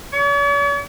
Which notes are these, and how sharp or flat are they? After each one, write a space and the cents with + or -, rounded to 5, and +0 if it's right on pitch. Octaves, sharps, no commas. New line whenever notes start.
C#5 +45